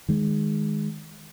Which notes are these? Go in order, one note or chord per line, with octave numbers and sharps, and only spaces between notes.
D#3 G#3